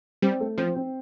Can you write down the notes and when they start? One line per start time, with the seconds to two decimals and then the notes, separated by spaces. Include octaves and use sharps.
0.22 G3 C4 C5
0.40 A3 A4
0.58 F3 C4 C5
0.75 C4 C5